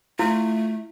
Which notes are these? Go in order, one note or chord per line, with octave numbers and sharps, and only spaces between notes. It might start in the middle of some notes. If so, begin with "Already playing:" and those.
A3 E4 F4